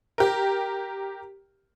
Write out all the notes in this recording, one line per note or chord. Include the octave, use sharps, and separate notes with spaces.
G4 A#4